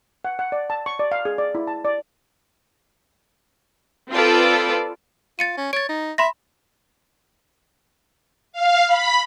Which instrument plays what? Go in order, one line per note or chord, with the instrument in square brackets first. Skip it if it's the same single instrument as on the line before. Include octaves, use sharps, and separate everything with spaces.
[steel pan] F#5
F#5
D5
A5
C#6
D5
F5
G#4
D5
E4
A5
D5
[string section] C4 F4 A4 B4 D5
[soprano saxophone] F4 [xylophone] A6 C#7 D#7
[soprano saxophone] C#4
[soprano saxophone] C#5 [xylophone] A6 D7
[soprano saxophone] D#4
[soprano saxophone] E5 [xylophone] B5 C6 A#6
[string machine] F5
B5